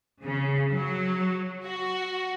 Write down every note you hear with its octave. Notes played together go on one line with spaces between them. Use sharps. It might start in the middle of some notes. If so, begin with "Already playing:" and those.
C#3
F#3
F#4